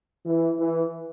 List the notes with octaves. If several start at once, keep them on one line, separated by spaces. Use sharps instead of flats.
E3
E3